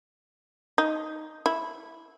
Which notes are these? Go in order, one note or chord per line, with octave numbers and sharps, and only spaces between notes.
D#4
E4